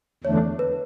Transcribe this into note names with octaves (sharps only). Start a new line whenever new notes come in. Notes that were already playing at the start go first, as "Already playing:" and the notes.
E2 D3 A3 D4 C#5
B4